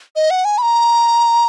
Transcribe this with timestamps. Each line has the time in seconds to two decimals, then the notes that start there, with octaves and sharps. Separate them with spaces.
0.16 D#5
0.30 F#5
0.45 G#5
0.58 B5
0.62 A#5